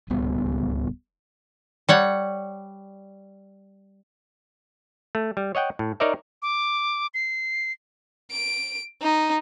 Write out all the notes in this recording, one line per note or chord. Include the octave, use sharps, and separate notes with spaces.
D1 C#2 G3 B3
G3 C#5 F#5
A3
G3
C#5 D#5 F#5 G5
A2
D#4 A#4 C#5 D5 E5
D6
C7
D7
D#4